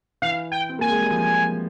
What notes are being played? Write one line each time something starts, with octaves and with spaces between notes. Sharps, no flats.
E3 F5
G5
C4
A#3 G#5
G#3
G3
F3